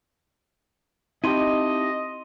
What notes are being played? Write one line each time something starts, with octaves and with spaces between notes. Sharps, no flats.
C4 D#4 E4 G4 D#5 A5 C6 D#7